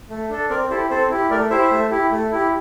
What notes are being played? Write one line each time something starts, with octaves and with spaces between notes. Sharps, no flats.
A3
D4 A4
C4 A#4 D5
E4 G4 A4 C5
C4 A4 C5
E4 G4
A3 A#4 D5
E4 G4 C5 E5
A3
E4 G4
A3
E4 G4